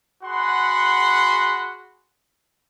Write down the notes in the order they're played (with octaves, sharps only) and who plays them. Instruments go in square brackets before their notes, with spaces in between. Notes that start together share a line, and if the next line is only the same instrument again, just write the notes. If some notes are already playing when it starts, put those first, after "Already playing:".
[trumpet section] F#4 G#4 F#5 B5 C6